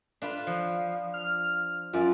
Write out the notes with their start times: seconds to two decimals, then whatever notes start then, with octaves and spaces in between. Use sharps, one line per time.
0.22 D4 F4 B4
0.47 F3
1.14 F6
1.93 F#2 F4 D5